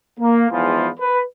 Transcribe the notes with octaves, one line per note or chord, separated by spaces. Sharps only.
A#3
E2 G#2 E3 F3 F4 B4
B4